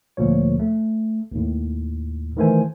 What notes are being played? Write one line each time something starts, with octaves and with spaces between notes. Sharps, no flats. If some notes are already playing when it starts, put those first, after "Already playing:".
D2 A#2 F3 C#5
A3
D#2 A2
D#3 E3 A3 C5 G#5